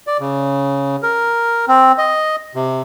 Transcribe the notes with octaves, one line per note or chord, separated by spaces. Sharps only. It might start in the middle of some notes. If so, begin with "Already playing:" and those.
D5
C#3
A#4
C4
D#5
C3